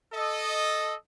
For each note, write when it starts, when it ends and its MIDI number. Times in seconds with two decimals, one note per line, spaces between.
0.12 0.93 69
0.12 0.93 75